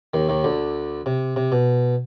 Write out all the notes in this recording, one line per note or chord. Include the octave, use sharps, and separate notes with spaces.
D#2 D#3
D#2 D#3
D2 D3
C3
C3
B2